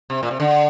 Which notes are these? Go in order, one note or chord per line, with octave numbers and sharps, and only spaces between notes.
C3
A#2
C3
D3